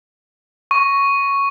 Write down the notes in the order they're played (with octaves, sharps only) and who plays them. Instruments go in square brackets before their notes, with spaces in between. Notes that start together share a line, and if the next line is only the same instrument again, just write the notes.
[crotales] C#6